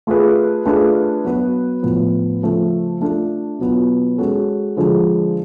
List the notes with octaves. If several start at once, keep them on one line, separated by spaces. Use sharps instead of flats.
A3 F4 G#4 B4
A3 D4 F4 G#4 B4
F#3 B3 F#4 B4
A2 F3 B3
C#3 F3 A3
A3 D4 F4 A4
B2 F#3 B3 F4
G#3 C#4 F#4 A4
D3 F3 G#3